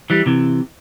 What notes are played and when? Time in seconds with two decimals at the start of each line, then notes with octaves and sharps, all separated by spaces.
0.10 E3 G3
0.26 C3 E3